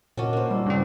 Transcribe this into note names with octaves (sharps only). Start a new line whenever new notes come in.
A#2 C#4 D4 F#4 A#4 D#5
A#3 C5
G3 E4 D5
G2 C#3 C4 E4